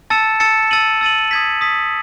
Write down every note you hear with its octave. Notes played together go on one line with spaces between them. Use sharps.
A5 E6 A6 C#7 E7
A5 E6 A6 C#7 E7
E6 A6 D#7 F#7
E6 A6 D#7 F#7
D#6 G#6 B6
D#6 G#6 B6